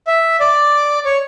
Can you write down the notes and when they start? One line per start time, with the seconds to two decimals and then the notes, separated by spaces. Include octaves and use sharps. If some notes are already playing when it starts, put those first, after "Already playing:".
0.07 E5
0.40 D5
1.05 C#5